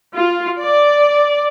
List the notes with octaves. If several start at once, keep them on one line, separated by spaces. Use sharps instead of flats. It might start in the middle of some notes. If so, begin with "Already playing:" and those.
F4
D5